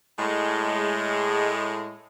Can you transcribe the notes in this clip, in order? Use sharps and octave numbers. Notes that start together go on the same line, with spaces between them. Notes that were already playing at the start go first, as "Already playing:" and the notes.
A2 G#3